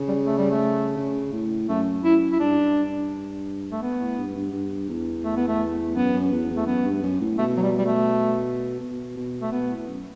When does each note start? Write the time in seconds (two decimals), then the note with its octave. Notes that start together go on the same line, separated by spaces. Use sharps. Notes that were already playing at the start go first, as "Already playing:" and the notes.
Already playing: C#3
0.08 G3
0.26 A3
0.38 G3
0.51 A3
0.97 C#3
1.32 A2
1.69 F#2 A3
2.04 F#2 E4
2.32 E4
2.39 G2 D4
3.72 A3
3.82 B3
3.99 A2
4.18 G2
4.36 G2
4.53 G2
4.89 E2
5.24 A3
5.36 B3
5.48 A3
5.96 F#2 B3
6.14 F#2
6.32 E2
6.50 E2
6.57 A3
6.67 F#2 B3
6.84 G2
7.03 F#2
7.20 A2
7.38 B2 A3
7.57 F#3
7.62 G3
7.78 G3
7.86 A3
8.80 B2
9.17 B2
9.41 A3
9.52 B2 B3
9.70 A2
9.87 F#2